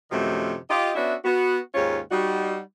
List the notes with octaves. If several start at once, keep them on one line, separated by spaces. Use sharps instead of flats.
F#2 C3 D#3 F3 F#3 A3
F4 G4 D#5
B3 C#4 D4 F#4 E5
B3 F#4
D#2 G#2 C#4 F4 C#5
G3 D#4 F#4